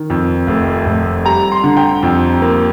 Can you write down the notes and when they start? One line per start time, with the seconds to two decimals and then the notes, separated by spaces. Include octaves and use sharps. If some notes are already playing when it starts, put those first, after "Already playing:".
Already playing: D#3
0.10 F2
0.47 F1
0.86 F1
1.25 G3 A#5
1.52 C6
1.64 D3
1.77 G5
2.03 F2
2.42 A#3